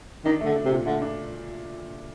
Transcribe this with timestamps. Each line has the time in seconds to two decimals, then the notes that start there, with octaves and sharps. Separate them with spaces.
0.25 D#3 D4
0.40 D3 A3
0.55 D4
0.65 C3
0.71 A#2
0.85 D3 A3
1.02 D4